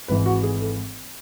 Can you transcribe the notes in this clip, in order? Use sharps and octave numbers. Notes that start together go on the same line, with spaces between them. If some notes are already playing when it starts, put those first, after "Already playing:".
G#1 G#2 E3 B4
F#4
G#4
A4